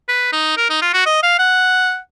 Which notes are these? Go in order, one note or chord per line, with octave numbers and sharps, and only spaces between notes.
B4
D#4
A#4
D#4
F4
F#4
D#5
F5
F#5